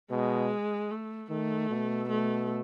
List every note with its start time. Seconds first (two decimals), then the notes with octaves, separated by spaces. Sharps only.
0.11 B2 G#3
0.91 A3
1.30 D#3 A3
1.70 B2
2.09 A3